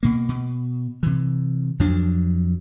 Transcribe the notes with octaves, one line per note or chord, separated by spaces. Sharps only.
B2 A#3
B2
C3 E3
F2 F3 F#3 D4